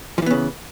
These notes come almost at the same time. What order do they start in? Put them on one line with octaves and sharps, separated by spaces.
F3 E3 B3 C#3